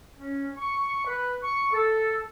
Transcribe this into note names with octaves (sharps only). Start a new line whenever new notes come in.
C#4
C#6
B4
C#6
A4